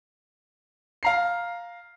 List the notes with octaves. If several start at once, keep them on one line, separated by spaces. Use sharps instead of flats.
F5 A#5 C7